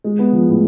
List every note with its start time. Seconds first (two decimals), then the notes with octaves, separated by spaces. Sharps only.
0.04 G#3
0.19 B3
0.33 F3
0.48 A2